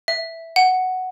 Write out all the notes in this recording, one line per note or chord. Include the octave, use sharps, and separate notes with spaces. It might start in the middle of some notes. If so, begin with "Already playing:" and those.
E5
F#5